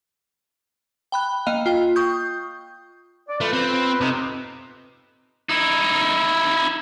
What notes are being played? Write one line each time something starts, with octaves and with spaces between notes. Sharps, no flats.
G5 B5 F#6
A#3 D#5 F5
F4 G5
C#6 D#6 G6
D5
A3 F4 B4
C4
C3 A3 D#4
D#4 E4